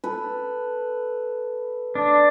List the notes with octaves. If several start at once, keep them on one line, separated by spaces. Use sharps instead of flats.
A4 B4
D4